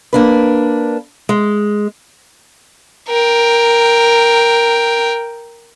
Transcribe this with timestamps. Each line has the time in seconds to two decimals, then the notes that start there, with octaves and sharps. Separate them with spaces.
0.13 A#3 D4 B4
1.29 G#3
3.09 A#4 G5